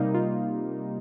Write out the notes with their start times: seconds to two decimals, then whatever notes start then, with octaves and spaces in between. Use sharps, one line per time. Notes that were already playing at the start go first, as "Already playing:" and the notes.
Already playing: C3 G3 A#3 D#4
0.15 F4